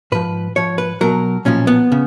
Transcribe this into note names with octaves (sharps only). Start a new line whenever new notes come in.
G#2 F3 B4
G#2 F3 C#5
B4
B1 B2 F#3 A#4
B1 A#2 F3 C#4
B3
C#3